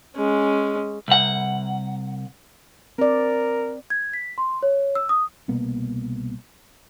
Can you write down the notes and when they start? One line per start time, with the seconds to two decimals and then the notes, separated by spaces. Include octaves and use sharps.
0.17 G#3 C#4
1.08 C2 F#5
2.98 C4 A#4 D5
3.90 G#6
4.14 B6
4.38 C6
4.63 C#5
4.95 E6
5.09 D#6
5.48 C2 B2 A#3 B3